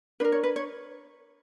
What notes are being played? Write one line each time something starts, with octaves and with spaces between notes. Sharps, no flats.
D4 A#4 B4
C#5
B4
C#5